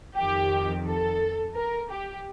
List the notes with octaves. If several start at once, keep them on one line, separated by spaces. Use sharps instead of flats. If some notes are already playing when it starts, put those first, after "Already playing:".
F2 D#3 G4
A4
A#4
G4